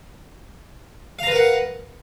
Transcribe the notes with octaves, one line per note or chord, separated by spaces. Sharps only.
A#4 B4 F5 F#5 A#5